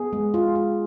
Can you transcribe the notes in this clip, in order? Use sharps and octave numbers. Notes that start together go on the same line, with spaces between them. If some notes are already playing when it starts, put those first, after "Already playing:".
Already playing: B3 G#4
G#3
F4
F4